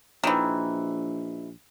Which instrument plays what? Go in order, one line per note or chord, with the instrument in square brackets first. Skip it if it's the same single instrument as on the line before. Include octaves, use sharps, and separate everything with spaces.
[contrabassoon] A#1 [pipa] D#3 E3